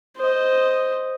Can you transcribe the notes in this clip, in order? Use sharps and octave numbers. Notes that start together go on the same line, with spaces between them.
C5 D#5